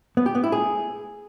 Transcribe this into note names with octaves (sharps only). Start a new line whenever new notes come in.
B3
G4
B3
E4
G#4